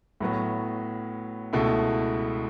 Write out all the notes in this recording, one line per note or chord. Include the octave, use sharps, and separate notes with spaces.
A2 F#3 B3
C#2 B2 A3 E4